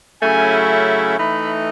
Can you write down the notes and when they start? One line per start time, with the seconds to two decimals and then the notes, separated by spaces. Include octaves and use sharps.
0.22 C#3 F#3 A3 C#4 E4 G#5
1.18 E3 A3 D#4 B5